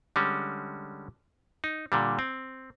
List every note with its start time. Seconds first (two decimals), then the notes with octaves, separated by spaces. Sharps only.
0.16 D3 G3 G#3 C#4
1.64 D#4
1.92 A#2 D3 G3
2.19 C4